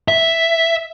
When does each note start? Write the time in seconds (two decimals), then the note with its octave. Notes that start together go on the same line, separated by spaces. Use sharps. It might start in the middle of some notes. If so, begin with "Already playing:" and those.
0.08 E5